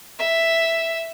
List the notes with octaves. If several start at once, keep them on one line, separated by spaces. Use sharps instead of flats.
E5